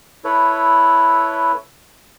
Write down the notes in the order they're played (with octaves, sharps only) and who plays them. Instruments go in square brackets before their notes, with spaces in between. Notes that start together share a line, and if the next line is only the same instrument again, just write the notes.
[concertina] E4 A4 B4 C#5